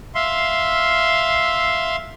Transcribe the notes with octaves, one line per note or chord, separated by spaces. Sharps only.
E5 F5 C6